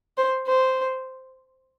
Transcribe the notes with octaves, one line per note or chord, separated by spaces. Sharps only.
C5
C5